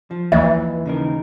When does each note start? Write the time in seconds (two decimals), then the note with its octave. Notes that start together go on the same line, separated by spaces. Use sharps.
0.11 F3
0.32 D#2 E3 A#3 D#5 E5
0.86 C#3 D#4 A#4